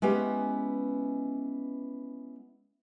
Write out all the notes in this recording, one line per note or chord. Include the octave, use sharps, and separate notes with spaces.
G#3 B3 C#4 E4 G4 B4